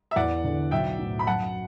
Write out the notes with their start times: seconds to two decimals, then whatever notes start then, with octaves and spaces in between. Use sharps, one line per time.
0.11 E5
0.16 E2 D5 F#5
0.44 D3
0.71 B1 E5 G5
0.99 A2
1.19 B5
1.27 F#2 F#5 A5